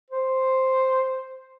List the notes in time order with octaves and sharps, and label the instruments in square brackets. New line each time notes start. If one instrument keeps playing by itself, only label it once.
[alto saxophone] C5